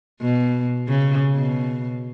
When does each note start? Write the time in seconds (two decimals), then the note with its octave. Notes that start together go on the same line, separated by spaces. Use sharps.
0.21 B2
0.88 C#3
1.36 B2